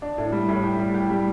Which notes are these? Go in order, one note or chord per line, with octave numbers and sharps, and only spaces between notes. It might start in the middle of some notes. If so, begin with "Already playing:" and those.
D4
A2
G3
A2
G4
G3
G4
G3